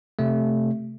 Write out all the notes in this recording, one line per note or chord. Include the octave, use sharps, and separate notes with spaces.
C3 A3